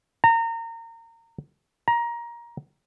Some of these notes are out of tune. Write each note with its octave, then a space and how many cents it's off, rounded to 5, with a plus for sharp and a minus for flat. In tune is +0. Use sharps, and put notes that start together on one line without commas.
A#5 -30
A#5 +15